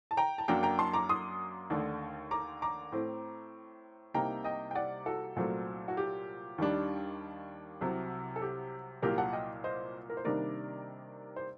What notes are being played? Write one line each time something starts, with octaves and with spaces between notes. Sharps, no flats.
A5
G5 A#5
A5
F#2 F#3 A#3 D4 G5 A#5
G5 A#5
A5 C6
A#5 D6
C6 D#6
D#2 D3 A3 D4
A#5 D6
A#5 D6
A2 A3 C4
C2 C3 G3 A#3 D#4 G5 A#5
D#5 G5
G5
D5 F#5
F#4 A4
C2 A#2 F#3 A3 C4
F#4
G4
D#2 D#3 G3 D4
C2 C3 F#3
A4
G4
C2 A#2 F#3 A#3 G4 A#4
F#5 A5
D#5 G5
C5 D#5
A#4
C5
C3 D#3 G3 A#3 D4 A#4 D5
C5